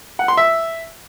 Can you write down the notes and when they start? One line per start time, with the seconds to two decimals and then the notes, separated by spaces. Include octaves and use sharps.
0.19 F#5
0.28 C6
0.37 E5